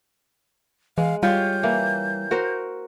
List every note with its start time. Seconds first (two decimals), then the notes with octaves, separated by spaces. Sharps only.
0.98 E3 G#3 F5
1.23 G3 F4 G4 C#5 G6
1.63 E3 A#3
2.31 F#4 A#4 C5